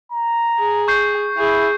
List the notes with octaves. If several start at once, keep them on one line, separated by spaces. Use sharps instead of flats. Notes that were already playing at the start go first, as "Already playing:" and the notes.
A#5
G#4
C#6 G6 C7
E4 G#4